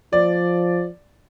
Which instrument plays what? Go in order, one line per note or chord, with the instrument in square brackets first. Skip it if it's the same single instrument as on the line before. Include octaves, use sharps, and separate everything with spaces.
[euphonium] F3 [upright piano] D5